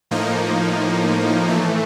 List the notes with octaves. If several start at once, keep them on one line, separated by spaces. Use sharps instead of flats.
A2 F3 A#3 D#4
A2 E3 A3